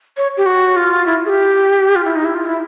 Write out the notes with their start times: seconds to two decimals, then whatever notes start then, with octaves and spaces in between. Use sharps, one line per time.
0.17 C#5
0.37 G4
0.46 F#4
0.76 F4
1.06 E4
1.26 G#4
1.29 G4
1.96 F4
2.05 E4
2.15 D#4
2.25 E4
2.35 F4
2.45 E4